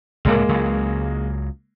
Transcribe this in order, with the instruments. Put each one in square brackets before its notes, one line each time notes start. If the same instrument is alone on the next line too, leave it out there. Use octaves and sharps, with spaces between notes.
[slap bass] C#2 A2 C3 [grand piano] G#3 A#3
[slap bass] C#2 C#3 F#3